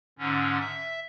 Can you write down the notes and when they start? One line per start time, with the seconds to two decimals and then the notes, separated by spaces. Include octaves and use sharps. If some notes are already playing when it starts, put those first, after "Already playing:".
0.19 G#2 D3 C#4
0.60 E5